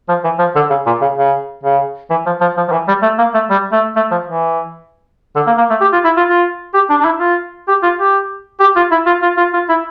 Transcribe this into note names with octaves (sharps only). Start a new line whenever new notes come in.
F3
E3
F3
D3
C#3
A#2
C#3
C#3
C#3
E3
F3
F3
F3
F3
E3
G3
A3
A#3
A3
G3
A3
A3
F3
E3
D3
A#3
A#3
A3
G4
F4
E4
F4
F4
G4
D4
D4
E4
F4
G4
F4
G4
G4
F4
E4
F4
F4
F4
F4
E4